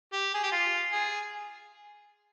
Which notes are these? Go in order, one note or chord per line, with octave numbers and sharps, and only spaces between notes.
G4
G#4
G4
F4
G#4